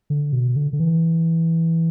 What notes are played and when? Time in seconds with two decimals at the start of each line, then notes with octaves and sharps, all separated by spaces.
0.10 D3
0.33 B2
0.56 D3
0.73 D3
0.80 E3